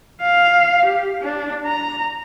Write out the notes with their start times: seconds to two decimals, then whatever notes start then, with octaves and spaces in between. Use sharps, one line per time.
0.22 F5
0.86 G4
1.22 D4
1.66 A#5